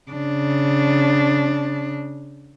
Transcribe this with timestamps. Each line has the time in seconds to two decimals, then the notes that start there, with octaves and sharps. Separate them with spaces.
0.11 C#3 D4